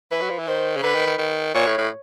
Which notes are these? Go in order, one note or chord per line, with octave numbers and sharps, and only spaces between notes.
E3 B4
F#3
F3
E3
D#3 C5
C#3
D3 B4
D#3
D#3
D#3
A#2 C#5
A2
A2